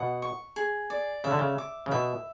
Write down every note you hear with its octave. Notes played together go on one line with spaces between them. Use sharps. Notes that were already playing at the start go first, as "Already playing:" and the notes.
Already playing: B2 F#5
C#6
G#4
D5
C#3 E5
D3
C#3
D6
C#3
B2 E5